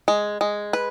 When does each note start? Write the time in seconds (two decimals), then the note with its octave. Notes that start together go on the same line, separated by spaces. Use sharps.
0.08 G#3
0.41 G#3
0.73 B4